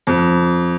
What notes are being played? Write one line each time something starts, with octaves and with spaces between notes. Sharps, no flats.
F2